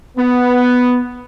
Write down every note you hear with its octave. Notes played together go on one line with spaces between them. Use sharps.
B3